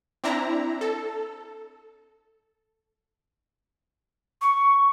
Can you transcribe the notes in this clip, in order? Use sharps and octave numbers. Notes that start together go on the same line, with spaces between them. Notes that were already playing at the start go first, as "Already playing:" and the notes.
C4 D4 E4 A#5
A4
C#6